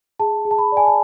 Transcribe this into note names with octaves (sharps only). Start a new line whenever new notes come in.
G#4 A5
G#4
A5
B5
D5 G#5
A5